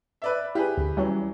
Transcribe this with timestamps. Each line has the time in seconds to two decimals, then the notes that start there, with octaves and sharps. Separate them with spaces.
0.22 B4 D5 E5
0.55 E4 G4 G#4 B4
0.78 D2
0.97 E3 F#3 G3 C#4